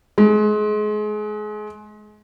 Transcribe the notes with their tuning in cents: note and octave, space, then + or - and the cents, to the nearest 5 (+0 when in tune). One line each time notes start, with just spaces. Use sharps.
G#3 +30